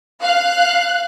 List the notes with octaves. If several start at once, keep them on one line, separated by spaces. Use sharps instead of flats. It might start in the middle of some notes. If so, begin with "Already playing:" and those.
F5 F#6